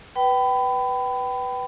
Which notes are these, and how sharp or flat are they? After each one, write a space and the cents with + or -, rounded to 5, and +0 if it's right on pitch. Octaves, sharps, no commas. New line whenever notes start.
B4 +0 G5 -25 B5 +25